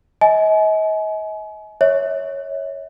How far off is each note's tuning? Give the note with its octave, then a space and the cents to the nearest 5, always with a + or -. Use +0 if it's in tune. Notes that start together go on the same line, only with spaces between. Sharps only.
D#5 +40 G#5 +35
C#5 +0 E5 -40